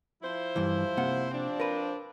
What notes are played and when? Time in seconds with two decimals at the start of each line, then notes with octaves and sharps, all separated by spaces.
0.23 F3 E4 C5
0.56 G2 E3
0.97 C3 A#3 F#5
1.31 F3 C4 D4
1.60 A#4 B4